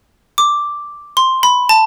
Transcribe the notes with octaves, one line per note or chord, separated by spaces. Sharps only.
D6
C6
B5
A5